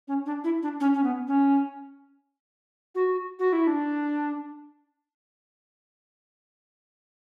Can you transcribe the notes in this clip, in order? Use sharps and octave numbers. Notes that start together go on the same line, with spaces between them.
C#4
D4
E4
D4
C#4
C#4
B3
C#4
F#4
F#4
E4
D4